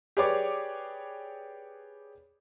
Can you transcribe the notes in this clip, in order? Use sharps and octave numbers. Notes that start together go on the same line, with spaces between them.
G4 G#4 B4 C#5 D5 D6